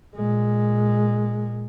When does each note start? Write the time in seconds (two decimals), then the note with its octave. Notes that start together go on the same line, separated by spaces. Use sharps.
0.16 A#2 G#3